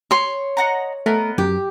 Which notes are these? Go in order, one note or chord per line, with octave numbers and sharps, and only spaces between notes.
C#5 C6
D#5 F#5 A#5
A3 B3 A#4 D#5
F#2 G4